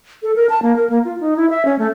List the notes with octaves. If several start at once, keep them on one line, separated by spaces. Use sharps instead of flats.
A4
A#4
A5
A#3
A#4
A#3
F4
D#4
E4
E5
C#4
A3